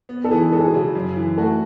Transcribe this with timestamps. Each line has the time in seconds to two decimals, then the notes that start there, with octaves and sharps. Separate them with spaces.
0.09 B3
0.24 A4
0.31 E3 G#4
0.52 G#3 A4
0.60 G#4
0.68 F#4
0.74 C#3 G#4
0.95 F#2
1.16 E3
1.37 A3 F#4 A4